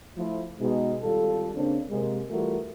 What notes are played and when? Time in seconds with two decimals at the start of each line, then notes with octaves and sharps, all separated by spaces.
0.17 F3 A3 E4
0.59 B2 G#3 D#4
1.02 G#1 G3 F4 A4
1.55 C#3 A#3 C4 D4
1.90 C3 G#3 A#3
2.30 E3 G3 A3 F4 F#4 A#4